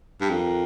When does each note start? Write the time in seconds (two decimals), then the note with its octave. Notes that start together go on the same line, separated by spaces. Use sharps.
0.21 G2
0.29 F2 A#4